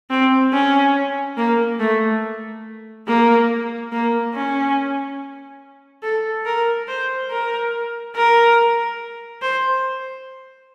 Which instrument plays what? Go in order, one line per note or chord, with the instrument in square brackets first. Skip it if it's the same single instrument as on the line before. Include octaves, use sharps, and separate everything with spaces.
[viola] C4
C#4
A#3
A3
A#3
A#3
C#4
A4
A#4
C5
A#4
A#4
C5